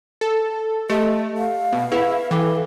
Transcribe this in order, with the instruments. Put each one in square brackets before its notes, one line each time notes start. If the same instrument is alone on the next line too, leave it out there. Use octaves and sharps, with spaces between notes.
[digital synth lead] A4
[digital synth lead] A3 [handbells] G4 [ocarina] D#5
[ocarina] F5
[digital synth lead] B2
[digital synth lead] E4 [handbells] G#4 B4 F#5
[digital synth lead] E3 [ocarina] A4 [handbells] F5 G5 D6